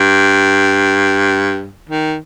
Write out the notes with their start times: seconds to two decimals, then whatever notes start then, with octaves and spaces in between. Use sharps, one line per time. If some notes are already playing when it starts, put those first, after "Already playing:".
Already playing: G2
1.89 D#3